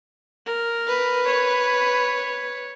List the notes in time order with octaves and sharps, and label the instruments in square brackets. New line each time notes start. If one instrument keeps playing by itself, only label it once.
[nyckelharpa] A#4
[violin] B4
[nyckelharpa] C#5